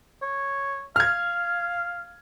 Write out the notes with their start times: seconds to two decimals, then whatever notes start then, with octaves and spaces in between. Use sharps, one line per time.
0.22 C#5
0.96 F5 F6 G#6